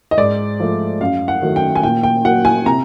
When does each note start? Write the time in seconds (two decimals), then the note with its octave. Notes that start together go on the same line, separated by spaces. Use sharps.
0.11 D#5
0.17 G#2 D5
0.60 F3 A3
1.01 F#2 F5
1.28 F#5
1.42 D#3 F#3 A3
1.56 G5
1.75 G#5
1.83 A#2 G5
2.03 G5
2.25 F#3 A#3 F#5
2.45 G#5
2.66 C3 A#5